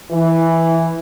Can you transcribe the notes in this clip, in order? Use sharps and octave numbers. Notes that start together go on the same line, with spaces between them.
E3